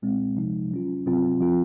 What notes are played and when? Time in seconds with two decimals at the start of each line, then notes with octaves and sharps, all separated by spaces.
0.02 A#2 G#3 C4
0.37 C3 F3 G#3 D#4
0.71 F#3 C#4 F4
1.06 C3 F#3 C4 F4
1.40 F3 C4 F4